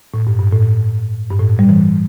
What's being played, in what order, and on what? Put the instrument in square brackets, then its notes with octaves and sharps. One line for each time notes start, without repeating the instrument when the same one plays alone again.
[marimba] A2
G2
G2
A2
G2
A2
G3
E3